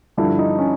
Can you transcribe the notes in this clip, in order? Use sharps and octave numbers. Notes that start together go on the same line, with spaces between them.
G2 D3 F3 E4
D#4
C#4